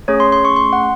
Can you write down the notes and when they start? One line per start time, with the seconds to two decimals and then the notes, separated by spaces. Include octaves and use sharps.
0.08 A3 C#4 G#4 C#5
0.20 C6
0.32 C6
0.45 C#6
0.56 C6
0.73 F#5